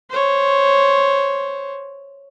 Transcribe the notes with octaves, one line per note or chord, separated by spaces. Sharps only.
C5 C#5